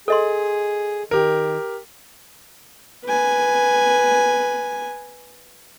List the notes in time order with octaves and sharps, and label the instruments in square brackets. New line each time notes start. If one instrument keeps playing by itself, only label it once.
[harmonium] G#4 [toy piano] A4 D#5 C6
[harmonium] D#3 [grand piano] G4 A#4
[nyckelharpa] B4 G#5